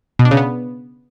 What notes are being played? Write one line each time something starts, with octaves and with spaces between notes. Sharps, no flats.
B2
D4
C#3
B3